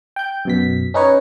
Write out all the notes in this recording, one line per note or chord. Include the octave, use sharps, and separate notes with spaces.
G5 G6
F#2 B2 B6
C#4 D#4 B4 C#5